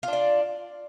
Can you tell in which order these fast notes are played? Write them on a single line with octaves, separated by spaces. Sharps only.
F4 D4 D5